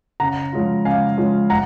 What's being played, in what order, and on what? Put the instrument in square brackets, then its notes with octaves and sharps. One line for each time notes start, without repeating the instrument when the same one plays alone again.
[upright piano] C#3 F#5 A#5
F3 G#3 C#4 F4
C#3 F5 G#5
F3 G#3 C#4 F4
F#5 A#5